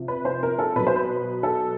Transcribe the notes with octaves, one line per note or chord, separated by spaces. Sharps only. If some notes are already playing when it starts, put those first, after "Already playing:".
Already playing: C3 F3
B4
C5
A#4
A4
B2 F#3 B4
C5
B4
A4